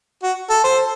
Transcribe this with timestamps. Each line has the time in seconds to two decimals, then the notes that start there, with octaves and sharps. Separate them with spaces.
0.23 F#4
0.50 A4
0.64 C5